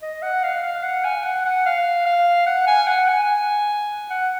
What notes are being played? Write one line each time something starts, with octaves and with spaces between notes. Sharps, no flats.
D#5
F#5
F5
F5
F#5
G#5
F#5
F#5
F5
F5
F#5
G#5
F#5
G#5
F#5